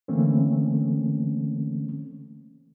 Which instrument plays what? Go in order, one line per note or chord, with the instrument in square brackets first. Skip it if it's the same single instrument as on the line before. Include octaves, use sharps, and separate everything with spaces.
[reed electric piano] D3 E3 A3 A#3 C4 C#4